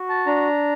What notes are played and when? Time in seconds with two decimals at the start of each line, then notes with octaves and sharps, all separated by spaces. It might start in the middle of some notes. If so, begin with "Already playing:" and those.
Already playing: F#4
0.09 A5
0.27 D4 A#5